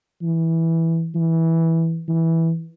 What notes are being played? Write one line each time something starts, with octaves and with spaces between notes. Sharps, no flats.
E3
E3
E3